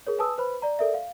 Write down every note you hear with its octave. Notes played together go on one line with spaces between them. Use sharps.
G#4 A#4 C#5
B4 G#5 A5 D#6 E6
B4 C5 B5
D5 A#5
A4 A#4 D5 E5
F5